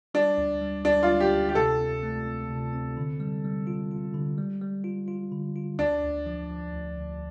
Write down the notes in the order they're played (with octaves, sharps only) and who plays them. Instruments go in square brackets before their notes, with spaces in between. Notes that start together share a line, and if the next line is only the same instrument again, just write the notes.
[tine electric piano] G3 [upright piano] D4
[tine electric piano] D2
G3
[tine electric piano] D2 [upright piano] D4
[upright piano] F4
[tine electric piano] G3
[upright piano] G4
[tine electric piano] D2
[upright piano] G4
[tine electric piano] C3 [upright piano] A4
[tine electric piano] C4
A3
C4
C3
C4
D3
G3
G3
F4
F4
D3
G3
G3
F4
F4
D3
F4
[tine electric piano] D2 [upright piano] D4
[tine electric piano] D2
F3
F3
D2
D2